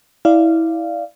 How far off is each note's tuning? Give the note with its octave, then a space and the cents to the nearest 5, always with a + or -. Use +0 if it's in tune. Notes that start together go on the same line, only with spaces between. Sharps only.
E4 -20 D5 +0 F5 -15